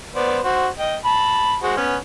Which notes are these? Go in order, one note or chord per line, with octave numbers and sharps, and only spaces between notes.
B3 C5 D5
F#4 C5
D#5 G5
A5 B5
G#3 F#4 C5
B3 C#4